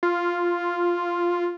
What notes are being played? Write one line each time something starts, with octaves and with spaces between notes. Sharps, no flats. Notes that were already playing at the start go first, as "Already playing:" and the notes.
F4